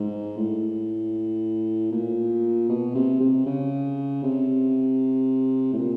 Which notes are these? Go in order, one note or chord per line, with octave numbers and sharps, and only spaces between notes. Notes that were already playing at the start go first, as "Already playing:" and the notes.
Already playing: G#2
A2
A#2
B2
C3
C3
C#3
C3
A2
A#2